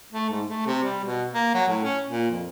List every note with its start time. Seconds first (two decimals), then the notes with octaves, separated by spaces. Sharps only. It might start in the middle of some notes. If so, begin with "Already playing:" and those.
0.12 A3
0.30 G#2
0.47 A3
0.67 C3
0.84 G3
1.05 B2
1.34 A#3
1.54 F#3
1.69 A2
1.84 C#4
2.08 A#2
2.30 F2